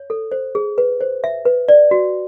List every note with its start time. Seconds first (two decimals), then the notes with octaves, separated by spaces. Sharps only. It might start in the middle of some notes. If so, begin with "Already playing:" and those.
Already playing: C#5
0.10 A4
0.32 C5
0.55 G#4
0.78 B4
1.01 C5
1.24 E5
1.45 B4
1.68 D5
1.91 F#4